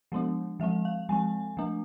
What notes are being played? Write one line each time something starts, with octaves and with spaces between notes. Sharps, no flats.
F3 G#3 B3 D4
F3 G#3 C4 E5
F5
F3 G#3 C4 G#5
F3 A3 D4